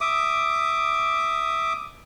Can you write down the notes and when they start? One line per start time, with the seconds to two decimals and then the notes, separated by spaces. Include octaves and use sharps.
0.01 E5 D6 D#6